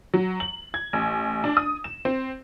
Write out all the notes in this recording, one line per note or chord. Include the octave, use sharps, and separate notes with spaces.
F#3
F#7
G#6
A1
D4
D#6
E7
C4